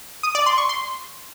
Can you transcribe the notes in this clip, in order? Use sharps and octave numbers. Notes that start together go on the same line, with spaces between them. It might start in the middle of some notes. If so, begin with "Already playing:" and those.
D#6
D5
C6
C#6
C6